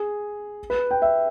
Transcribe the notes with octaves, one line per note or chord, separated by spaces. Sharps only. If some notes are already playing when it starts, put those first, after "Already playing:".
Already playing: G#4
B4
G5
E5